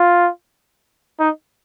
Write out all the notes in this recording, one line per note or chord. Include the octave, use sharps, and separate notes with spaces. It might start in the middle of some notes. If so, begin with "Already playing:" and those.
Already playing: F4
D#4